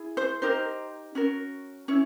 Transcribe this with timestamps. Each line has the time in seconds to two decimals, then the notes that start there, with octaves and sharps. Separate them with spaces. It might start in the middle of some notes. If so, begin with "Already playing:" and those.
Already playing: E4 G#4
0.17 C5
0.42 D#4 G4 A#4 C5
1.15 C#4 F#4 A#4
1.88 C#4 E4 C#5